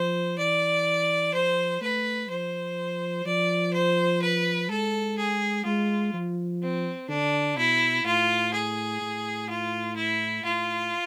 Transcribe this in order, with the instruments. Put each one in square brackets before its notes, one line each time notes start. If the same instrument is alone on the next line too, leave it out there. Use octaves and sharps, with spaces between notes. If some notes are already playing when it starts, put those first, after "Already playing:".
Already playing: [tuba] F3 [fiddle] C5
[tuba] E3 [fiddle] D5
[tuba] F3 [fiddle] C5
[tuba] A3 [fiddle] B4
[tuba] F3 [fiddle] C5
[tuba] F3 [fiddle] D5
[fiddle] C5
B4
[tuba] G#3 [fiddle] A4
[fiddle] G#4
[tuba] G#3 [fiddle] F4
[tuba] F3
[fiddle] C4
[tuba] D3 [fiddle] D4
[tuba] B2 [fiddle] E4
[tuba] A2 [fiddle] F4
[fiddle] G#4
[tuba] A2
[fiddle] F4
E4
[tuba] A2 [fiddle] F4